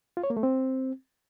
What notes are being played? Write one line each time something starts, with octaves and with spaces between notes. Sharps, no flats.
F4
C#5
A#3
A3
C4